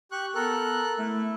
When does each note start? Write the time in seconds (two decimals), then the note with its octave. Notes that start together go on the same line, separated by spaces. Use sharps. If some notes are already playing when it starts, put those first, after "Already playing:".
0.12 G4 C#6 F#6
0.35 B3 A4 A#4 F#6
0.98 A3 E4